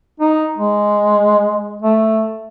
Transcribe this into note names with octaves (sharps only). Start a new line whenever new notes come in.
D#4
G#3
A3